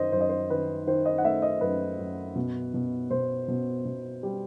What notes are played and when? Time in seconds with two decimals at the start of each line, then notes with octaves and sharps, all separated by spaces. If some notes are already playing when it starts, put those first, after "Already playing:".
Already playing: F#2 D#3 C5 D#5
0.12 F#2 C5
0.21 D#5
0.29 C5
0.50 D#3 B4
0.87 D#3 C5
1.05 D#5
1.18 F#5
1.24 A3 E5
1.42 D#5
1.61 F#2 B4
1.99 F#2
2.36 B2
2.74 B2
3.11 B2 C5
3.48 B2
3.85 B2
4.23 G3